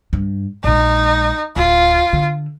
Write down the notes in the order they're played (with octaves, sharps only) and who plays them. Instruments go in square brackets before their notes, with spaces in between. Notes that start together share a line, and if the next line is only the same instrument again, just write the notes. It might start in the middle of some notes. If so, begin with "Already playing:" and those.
[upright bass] G2
[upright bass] A#1 G#3 [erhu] D#4
[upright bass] D1 [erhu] F4
[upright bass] D3